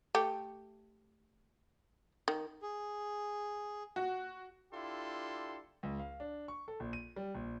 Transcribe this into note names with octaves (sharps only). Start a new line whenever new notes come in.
A3 G4
D#3
G#4
F#4
D4 E4 F4 G4 A4 C6
C#2
F5
D4
C#6
A4
A#1
D#7
G3
A#1